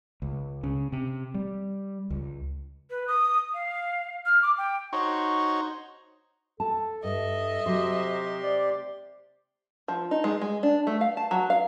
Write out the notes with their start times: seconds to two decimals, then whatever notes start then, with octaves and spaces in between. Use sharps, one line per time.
0.22 C#2
0.63 C#3
0.92 C3
1.34 G3
2.10 C#2
2.90 B4
3.08 D#6
3.54 F5
4.26 F6
4.42 D6
4.58 G5
4.93 D#4 F#4 C5 C#5
6.60 A4 A5
7.04 G2 D#5 E5
7.66 C3 F#3 G4 C5 C6
8.42 D5
9.88 F3
10.11 D#4
10.24 G#3
10.41 G#3
10.63 D4
10.87 A3
11.01 F5
11.17 A5
11.31 F#3
11.50 F5